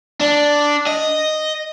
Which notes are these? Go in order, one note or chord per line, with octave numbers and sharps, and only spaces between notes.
D4
D#5